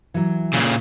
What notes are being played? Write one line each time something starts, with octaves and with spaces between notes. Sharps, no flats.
E3 F#3
A#2 C#3